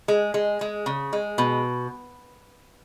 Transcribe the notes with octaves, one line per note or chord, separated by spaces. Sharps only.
G#3
G#3
G#3
C#3
G#3
B2